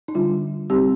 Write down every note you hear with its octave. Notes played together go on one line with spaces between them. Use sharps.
D#4
D3 G3 D4 F4
G3 C4 D#4 G4